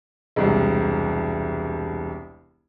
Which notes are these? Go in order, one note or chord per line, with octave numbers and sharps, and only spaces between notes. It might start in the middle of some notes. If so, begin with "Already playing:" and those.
E1 C2